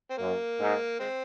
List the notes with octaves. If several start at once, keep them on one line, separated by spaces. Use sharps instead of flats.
C4
F#2 A#3
G#2
G#3 C4